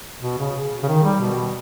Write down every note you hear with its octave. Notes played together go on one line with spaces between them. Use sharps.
B2
C#3
C#3
D#3
G3
B2